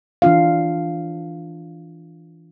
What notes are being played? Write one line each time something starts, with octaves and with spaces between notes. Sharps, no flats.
E3 D4 F4 F5